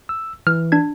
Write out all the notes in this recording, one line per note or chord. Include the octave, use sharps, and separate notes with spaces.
E6
E3 F6
D4 G#6